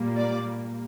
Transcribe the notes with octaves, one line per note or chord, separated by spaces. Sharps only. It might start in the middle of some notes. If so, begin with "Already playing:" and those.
Already playing: A#2 G3 A#3
D5